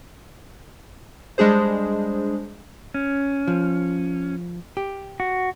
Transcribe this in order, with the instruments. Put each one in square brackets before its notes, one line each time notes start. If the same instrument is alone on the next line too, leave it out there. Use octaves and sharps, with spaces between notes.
[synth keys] G3 G#3 D4 G#4 C5
[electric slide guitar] C#4
[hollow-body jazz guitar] F3
G4
[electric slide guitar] F#4